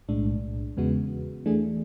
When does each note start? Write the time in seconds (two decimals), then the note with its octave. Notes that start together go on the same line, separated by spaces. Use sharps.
0.09 B1 A2 G#3 D4
0.77 E2 C#3 G#3 B3 F#4
1.46 E3 A3 D4 G#4